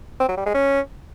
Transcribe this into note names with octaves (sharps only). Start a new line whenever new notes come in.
C4
F#3
G3
G#3
C#4